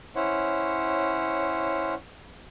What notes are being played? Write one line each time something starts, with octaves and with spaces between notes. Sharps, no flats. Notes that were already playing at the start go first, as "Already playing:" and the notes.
C#4 E4 C5 C#5 F#5